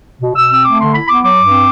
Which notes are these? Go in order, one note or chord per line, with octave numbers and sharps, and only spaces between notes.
B2
B2 E6
C4 E6
A3 D6
D3 C6
E4 B5
B3 D6
F#3 D6
G2
C4